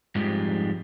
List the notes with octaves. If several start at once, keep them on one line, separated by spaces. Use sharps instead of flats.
F2 G#2 F3 G3 G#3